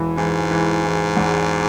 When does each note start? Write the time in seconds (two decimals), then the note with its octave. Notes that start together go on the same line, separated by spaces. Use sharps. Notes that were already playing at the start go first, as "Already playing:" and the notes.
Already playing: E1 E3
0.17 G#2 E3
0.51 E3
0.84 E3
1.17 E2